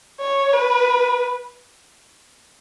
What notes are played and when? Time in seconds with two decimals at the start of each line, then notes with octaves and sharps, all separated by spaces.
0.20 C#5
0.53 B4